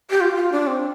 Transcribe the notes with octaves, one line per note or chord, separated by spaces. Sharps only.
G4
F4
F4
D4
C4